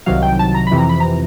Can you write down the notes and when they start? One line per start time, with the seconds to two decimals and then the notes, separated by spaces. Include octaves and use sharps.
0.06 C2 C3 D#3 F#3 F5
0.22 G5
0.39 A5
0.55 A#5
0.67 F2 C3 E3 B5
0.77 A#5
0.89 B5
1.00 A#5